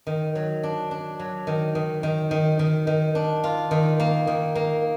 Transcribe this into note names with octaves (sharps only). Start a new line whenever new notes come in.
D#3
F#3
D4
D4
F#3
D#3
D#3
D#3
D#3
D#3
D#3
D4
F4
D#3
A#3
D#3
A#3